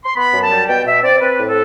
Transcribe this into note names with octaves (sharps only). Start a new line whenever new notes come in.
C6
B3 B5
F#2
A5
G3
B2 G5
B2 E5
C4 D5
C4 B4
A2
A4